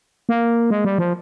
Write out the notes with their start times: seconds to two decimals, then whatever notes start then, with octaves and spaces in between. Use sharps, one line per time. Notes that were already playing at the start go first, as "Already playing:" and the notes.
0.29 A#3
0.70 G#3
0.85 G3
0.99 F3